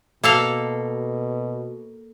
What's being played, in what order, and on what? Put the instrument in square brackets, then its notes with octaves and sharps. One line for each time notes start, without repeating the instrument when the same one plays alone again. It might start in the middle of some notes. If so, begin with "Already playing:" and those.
[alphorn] B2 [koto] A#3 A4 F5